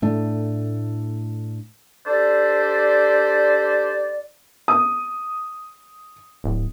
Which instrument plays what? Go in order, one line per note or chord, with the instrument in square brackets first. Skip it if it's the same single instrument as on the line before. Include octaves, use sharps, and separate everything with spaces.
[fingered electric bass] A2 A3 D4
[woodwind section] D4 G4 A4 C5 D5
[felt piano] D#6
[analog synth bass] D1